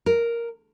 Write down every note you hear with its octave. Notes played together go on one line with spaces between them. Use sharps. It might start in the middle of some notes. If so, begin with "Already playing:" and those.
A#4